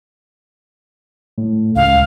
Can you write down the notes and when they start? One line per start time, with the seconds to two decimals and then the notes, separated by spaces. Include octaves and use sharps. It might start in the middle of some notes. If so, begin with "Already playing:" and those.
1.38 A2
1.76 C#2 F5